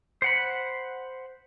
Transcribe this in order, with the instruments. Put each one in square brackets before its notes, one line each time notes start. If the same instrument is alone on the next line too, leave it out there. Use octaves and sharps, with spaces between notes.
[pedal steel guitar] C5 F#5 B5